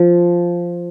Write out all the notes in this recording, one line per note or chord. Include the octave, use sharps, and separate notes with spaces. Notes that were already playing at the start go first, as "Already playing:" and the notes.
Already playing: F3